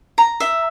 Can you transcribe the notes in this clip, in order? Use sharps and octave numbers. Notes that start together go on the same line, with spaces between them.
A#5
E5